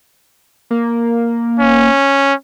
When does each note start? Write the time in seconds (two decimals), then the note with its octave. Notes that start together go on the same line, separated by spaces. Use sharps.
0.71 A#3
1.59 C#4